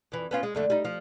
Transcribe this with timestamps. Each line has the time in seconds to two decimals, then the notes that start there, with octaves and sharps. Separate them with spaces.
0.12 F2 E3
0.31 B3 C#4 F4
0.43 G#3
0.55 F2 D3 A3
0.70 G3 D#4
0.85 F3